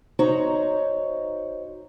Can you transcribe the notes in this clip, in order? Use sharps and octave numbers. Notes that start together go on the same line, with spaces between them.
D#4 F#4 C5 C#5 A#5